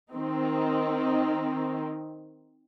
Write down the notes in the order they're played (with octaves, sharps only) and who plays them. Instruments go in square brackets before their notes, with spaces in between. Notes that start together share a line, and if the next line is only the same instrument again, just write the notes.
[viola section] D#3 C4 D#4